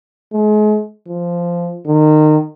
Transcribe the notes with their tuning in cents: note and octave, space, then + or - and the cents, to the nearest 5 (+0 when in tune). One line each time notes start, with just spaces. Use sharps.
G#3 +35
F3 -10
D#3 -25